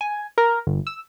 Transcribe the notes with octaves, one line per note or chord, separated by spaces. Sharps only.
G#5
A#4
G1
E6